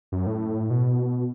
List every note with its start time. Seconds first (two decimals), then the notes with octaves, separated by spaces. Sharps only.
0.12 F#2
0.26 A2
0.70 B2